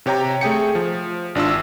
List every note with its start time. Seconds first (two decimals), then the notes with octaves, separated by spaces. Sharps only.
0.06 C3 G4 C#5 G5 A#5
0.41 A3 G#4 G5 C#7
0.75 F3
1.35 G#1 D4 F4 E6